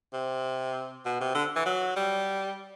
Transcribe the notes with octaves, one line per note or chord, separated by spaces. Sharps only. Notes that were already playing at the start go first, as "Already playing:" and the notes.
C3
B2
C3
D3
E3
F#3
G3